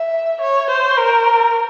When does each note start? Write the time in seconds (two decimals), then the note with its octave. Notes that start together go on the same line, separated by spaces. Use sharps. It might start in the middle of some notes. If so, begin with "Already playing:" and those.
Already playing: E5
0.41 C#5
0.70 C5
0.98 A#4